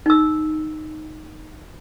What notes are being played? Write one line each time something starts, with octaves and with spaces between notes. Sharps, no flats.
D#4 E6